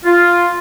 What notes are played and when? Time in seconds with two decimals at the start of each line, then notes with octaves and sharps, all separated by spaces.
0.05 F4